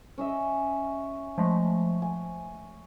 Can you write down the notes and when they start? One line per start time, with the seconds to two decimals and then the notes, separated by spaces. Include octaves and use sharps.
0.18 C#4 D#5 E5
1.38 F3 G#3 A3
2.02 G#5